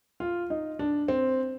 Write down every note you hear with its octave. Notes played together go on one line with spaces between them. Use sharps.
F4
D#4
D4
C4